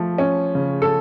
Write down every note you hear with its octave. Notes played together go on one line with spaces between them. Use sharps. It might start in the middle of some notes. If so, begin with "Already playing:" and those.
Already playing: F3 A3
C#4
C#3
A4